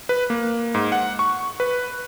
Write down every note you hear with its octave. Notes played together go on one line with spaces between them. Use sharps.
B4
A#3
G#2
F#5
C#6
B4